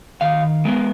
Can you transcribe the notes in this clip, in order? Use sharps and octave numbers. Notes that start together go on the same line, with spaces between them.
D#3 F5
G#3 B3 A#4